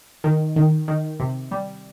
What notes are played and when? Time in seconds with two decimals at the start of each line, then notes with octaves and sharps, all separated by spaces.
0.24 D#3
0.56 D#3
0.88 D#3
1.20 C3
1.51 G3